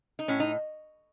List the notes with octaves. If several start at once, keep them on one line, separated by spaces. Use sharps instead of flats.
D#4
A2 C#4
D#4